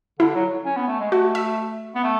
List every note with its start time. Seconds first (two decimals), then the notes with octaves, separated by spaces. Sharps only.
0.20 D3 E4
0.35 F#3
0.65 C#4
0.76 B3
0.88 A3
1.00 G#3
1.12 A3 F#4
1.35 E5
1.95 B3
2.04 A3